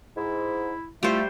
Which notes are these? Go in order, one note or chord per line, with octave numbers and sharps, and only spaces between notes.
G#2 E4
G3 A3 E4 F4 C5